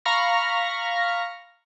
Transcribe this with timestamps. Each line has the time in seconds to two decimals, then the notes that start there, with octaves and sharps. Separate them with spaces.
0.05 F5 A#5 B5 C#6 F6 A#6